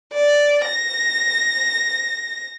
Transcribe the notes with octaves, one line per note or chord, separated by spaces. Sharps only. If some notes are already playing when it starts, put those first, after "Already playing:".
D5
A#6